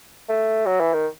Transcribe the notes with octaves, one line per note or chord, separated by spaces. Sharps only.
A3
F#3
E3
D#3